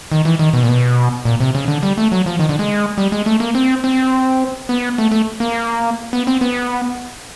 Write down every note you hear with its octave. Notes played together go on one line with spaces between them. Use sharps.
D#3
E3
D#3
B2
A#2
B2
A#2
C3
C#3
D3
G3
A3
F#3
F3
D#3
D3
G#3
G3
G#3
A3
A#3
C4
C4
B3
A3
A3
A#3
B3
C4
B3